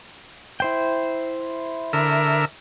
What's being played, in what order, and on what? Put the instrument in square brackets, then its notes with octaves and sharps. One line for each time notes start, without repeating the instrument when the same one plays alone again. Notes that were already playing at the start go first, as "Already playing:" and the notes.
[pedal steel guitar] E4 C5 G5
[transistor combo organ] D3 A#4 E5